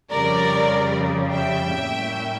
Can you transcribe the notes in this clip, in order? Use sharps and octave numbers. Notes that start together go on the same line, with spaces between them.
F2 C#3 G3 A#4 D5
E5 G5
A2 G3 A#3 C#4